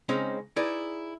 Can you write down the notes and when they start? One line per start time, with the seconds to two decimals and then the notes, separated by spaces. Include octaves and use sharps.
0.09 C#3 G#3 C4 C#4 D#4
0.56 D#4 E4 G#4 B4 D5